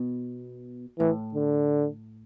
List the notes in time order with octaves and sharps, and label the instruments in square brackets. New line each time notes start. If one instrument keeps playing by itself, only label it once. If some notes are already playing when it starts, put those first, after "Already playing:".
Already playing: [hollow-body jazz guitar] B2
[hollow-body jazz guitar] A2 [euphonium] E3
[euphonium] D3